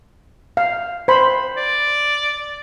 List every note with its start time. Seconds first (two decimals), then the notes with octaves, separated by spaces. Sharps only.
0.57 F5
1.08 C5 B5
1.57 D5